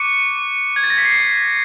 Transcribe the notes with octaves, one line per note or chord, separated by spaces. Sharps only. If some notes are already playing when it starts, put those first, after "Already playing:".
Already playing: C#6 D6 F#6 C#7
G#6
A6
A#6
B6
C7